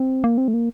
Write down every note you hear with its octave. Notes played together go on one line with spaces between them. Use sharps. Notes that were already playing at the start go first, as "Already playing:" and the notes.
Already playing: C4
A#3
C4
A3
A#3